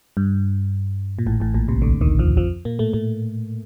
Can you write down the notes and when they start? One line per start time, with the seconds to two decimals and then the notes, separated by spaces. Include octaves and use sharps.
0.17 G2
1.19 A#2
1.26 A1 A2
1.40 A1 A2
1.54 A#1 A#2
1.68 C2 C3
1.82 D2 D3
2.01 D#2 D#3
2.19 F2 F3
2.37 F2 F3
2.65 A#2 A#3
2.79 A2 A3
2.93 A2 A3